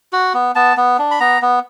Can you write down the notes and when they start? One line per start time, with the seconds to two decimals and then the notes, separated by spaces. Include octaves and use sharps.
0.13 F#4
0.34 B3
0.55 B3 A5
0.77 B3
0.99 D4
1.11 B5
1.20 B3 A#5
1.42 B3